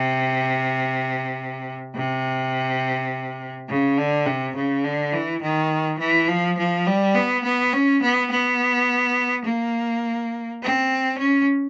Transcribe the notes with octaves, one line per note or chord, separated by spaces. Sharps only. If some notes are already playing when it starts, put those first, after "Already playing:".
Already playing: C3
C3
C#3
D3
C3
C#3
D3
E3
D#3
E3
F3
F3
G3
B3
B3
C#4
B3
B3
A#3
C4
C#4